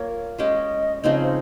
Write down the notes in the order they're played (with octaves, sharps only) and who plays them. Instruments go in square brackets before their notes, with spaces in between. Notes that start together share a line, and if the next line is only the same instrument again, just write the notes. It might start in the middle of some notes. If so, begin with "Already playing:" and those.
Already playing: [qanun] A#3 F4 A#4 [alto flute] C#5
[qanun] G#3 C#4 G4 [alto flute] D#5
[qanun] C#3 F3 C4 D#4 [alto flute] D#5
[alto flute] C#5
C5